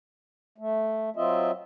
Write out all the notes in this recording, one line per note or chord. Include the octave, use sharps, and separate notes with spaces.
A3
F#3 C4 F4 D#5 E5